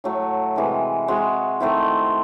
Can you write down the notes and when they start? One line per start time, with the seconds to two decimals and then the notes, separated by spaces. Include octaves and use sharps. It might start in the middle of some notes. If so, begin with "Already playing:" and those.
0.04 A2 F#3 A3
0.56 C3 E3 G#3
1.08 G#3 C4 F#4
1.60 D#3 A3 C4 E4